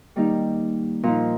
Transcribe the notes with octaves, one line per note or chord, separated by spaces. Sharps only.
D#3 G3 A#3 D#4 G4
A#2 F3 A#3 D#4